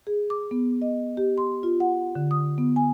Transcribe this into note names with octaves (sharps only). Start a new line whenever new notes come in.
G#4
D6
B3
D#5
G4
C6
F4
F#5
D3
D#6
B3
G#5